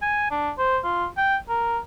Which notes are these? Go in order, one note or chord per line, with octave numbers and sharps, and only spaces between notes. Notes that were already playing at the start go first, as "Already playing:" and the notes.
G#5
D4
C5
F4
G5
A#4